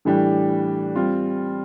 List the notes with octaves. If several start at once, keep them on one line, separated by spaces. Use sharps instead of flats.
A2 E3 G3 D4 G4
G3 C4 F4